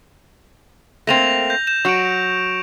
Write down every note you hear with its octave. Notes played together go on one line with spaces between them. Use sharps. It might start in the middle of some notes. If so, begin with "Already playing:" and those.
A3 A#3 C4 A#6 F7
G6 A#6
G6 E7
F#3 F#4 C#6 C#7 D7